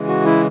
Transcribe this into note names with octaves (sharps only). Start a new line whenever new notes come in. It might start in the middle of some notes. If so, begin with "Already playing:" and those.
Already playing: C#3 E3 G#3
F#4
E4